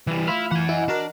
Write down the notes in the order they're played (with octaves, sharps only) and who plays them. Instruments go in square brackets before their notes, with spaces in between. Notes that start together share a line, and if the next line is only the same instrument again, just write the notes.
[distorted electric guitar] E3 G3 [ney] E4
[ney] A3 [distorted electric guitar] E4 [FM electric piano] F4 B5 F6
[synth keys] E3 [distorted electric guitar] F#5 G#5
[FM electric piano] E4 [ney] D#5
[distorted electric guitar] D4 [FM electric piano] F#4 A#4